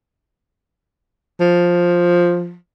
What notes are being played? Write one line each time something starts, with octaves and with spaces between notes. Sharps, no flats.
F3